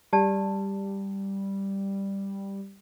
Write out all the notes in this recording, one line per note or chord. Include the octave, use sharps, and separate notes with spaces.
G3 G4 D5 A5